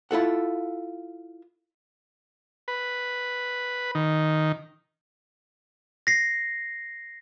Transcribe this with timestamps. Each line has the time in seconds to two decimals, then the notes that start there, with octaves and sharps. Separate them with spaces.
0.11 E4 F4 A4 F#5
2.68 B4
3.95 D#3
6.07 A#6 C7